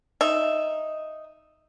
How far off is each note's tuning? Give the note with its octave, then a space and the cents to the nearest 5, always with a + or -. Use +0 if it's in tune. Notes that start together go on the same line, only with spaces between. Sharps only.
D#4 +0 E5 +0